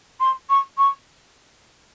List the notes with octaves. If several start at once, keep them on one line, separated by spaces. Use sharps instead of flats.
C6
C#6
C#6